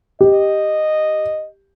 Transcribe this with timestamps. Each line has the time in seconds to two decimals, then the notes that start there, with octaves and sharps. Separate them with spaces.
0.21 G4 D#5